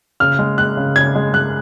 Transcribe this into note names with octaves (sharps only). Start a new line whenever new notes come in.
C#3 F6
G#3
G#3 F#6
C#3
C#3 G#6
G#3
G#3 F#6